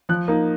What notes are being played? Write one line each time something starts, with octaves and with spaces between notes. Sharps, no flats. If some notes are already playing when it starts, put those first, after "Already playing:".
F3 F#6
A#3 D#4